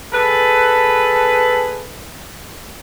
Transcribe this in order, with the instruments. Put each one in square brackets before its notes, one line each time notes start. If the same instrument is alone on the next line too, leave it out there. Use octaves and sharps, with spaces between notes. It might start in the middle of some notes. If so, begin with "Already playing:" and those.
[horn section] G#4 A4 B4